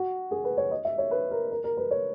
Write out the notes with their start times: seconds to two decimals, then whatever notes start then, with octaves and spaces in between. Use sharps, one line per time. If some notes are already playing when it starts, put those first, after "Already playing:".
Already playing: F#4
0.31 G#4
0.44 B4
0.57 C#5
0.71 D#5
0.85 E5
0.98 C#5
1.11 B4
1.31 A#4
1.51 A#4
1.64 A#4
1.77 B4
1.91 C#5